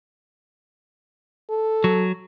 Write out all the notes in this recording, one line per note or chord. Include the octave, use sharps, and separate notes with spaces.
A4
F#3